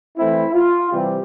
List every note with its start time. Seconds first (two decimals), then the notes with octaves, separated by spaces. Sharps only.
0.17 E3 A3 C4 E4
0.54 F4
0.92 C3 E3 G3 C4 G4